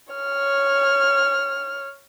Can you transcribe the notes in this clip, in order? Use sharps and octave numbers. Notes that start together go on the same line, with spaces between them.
C#5 F6